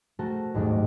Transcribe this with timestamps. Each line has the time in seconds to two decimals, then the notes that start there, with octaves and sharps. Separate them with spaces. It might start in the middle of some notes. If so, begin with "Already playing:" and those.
0.19 A3 C4 F#4 A4 A#4
0.54 A1 D#2 G#2 F#3 A3